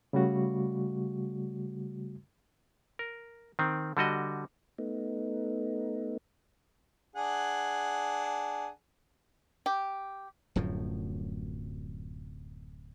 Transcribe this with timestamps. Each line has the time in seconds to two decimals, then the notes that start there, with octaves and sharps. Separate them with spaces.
0.13 C#3 G3 A3 F#4
2.99 A#4
3.59 D#3 C4
3.97 D3 G3 F#4 D#5
4.78 A3 B3 D#4
7.16 D4 G#4 F#5
9.66 G4
10.56 D1 F#2 A2 F3